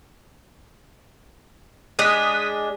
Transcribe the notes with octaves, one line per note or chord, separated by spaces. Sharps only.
G#3 D4 D#6 F#6 B6